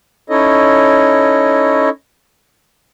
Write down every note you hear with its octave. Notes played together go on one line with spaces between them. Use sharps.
C#4 D#4 E4 A4 C#5 D#5